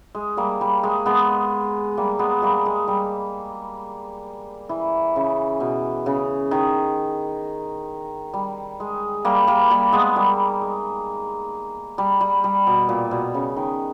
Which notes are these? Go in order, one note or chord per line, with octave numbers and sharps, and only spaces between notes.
G#3
G3 A#3
G3
G#3
G#3 B3
G3 A#3
G#3 B3
G3 A#3
G#3
G3
E3
C#3
B2
C#3
D#3
G3
G#3
G3 A#3
G3 A#3
G3 A#3
G#3 B3
G3 A#3
G#3
G3
G3
G3
B2
A#2
B2
C#3
D#3